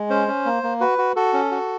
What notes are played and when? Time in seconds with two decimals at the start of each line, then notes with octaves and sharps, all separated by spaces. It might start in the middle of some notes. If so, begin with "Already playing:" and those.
Already playing: G#3
0.10 C#4 C5
0.28 C#4
0.45 A#3
0.63 A#3
0.81 F#4 B4
0.98 F#4
1.16 F#4 A4
1.33 C#4
1.51 F#4